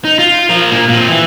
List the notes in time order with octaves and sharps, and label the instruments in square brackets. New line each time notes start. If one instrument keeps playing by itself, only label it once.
[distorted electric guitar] D#4
F4
F3 A#4
A#2 A#3
A#2 C4
E3